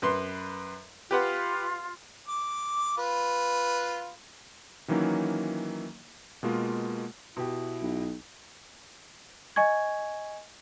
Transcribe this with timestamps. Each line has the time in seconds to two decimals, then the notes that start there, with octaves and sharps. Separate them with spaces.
0.02 F#2 B4 C6
1.11 F4 G4 B4 F#5
2.28 D6
2.98 F4 B4
4.88 D#3 E3 F#3 A#3 C#4 D#4
6.43 B2 G#3 A#3 F4
7.36 B2 E4 G4
7.82 B1
9.56 D#5 G#5 C#6 G#6